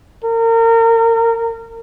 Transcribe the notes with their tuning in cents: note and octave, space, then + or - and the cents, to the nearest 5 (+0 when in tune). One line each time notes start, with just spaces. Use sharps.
A#4 -30